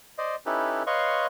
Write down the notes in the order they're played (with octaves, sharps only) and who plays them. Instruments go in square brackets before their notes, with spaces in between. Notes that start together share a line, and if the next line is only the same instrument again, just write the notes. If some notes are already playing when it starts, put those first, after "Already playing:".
[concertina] C5 D5 D#5
C#4 D#4 E4 G4 A4 B4
B4 C#5 D#5 F5 C6 C#6